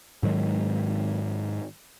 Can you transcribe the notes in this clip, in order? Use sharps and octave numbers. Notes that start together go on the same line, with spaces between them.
G#2 D#3 F#3 G#3